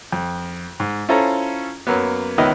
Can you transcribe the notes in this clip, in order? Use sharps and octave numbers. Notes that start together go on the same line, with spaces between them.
F2
G#2
C#4 E4 F4 A4 C5 A#5
F#2 F#3 A#3 B3
C#2 D#3 E3 B3 E4 D#5